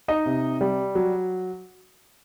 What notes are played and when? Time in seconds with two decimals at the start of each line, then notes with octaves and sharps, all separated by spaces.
0.08 D#4 D#5
0.26 C3
0.61 G3
0.95 F#3